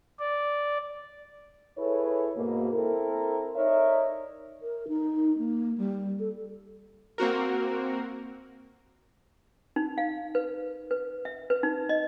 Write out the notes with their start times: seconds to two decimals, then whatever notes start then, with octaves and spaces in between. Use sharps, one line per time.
0.19 D5
1.77 E4 G#4 A4 B4 C#5
2.36 G#2 B2 A#3
2.72 C4 E4 A4 A#4
3.55 D#4 A#4 C#5 D5 E5
4.62 A#4
4.88 D#4
5.38 A#3
5.78 G3
6.20 A4
7.18 A#3 C4 F#4 A#4
9.76 D#4
9.98 F5
10.35 B4
10.91 B4
11.25 E5
11.50 B4
11.63 D#4
11.89 D#5